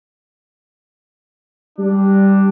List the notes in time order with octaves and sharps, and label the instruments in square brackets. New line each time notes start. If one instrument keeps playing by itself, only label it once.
[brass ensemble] G3 D4